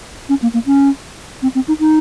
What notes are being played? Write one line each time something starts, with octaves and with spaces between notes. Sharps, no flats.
C#4
A#3
A#3
C#4
C4
C4
D#4
D#4